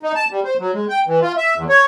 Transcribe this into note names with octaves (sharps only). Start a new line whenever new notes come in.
D#4
A5
G3
C5
F#3
G#3
G5
E3
F4
E5
E2
C#5